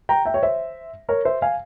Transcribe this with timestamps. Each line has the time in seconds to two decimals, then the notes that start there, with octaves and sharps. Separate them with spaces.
0.09 G5 A#5
0.25 E5 G5
0.34 C#5
0.43 C5 E5
1.09 A#4 C#5
1.25 C5 E5
1.42 F5 G#5